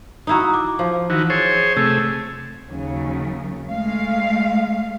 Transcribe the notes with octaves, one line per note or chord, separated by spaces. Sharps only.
D#4 E4 F#4 A#5 D#6
D6
F3
D#3 E3 F#4
G#4 C5 C#5 A6
C3 A3 G#4 E6
D#2 C#3 F#3
G#3 A3 F5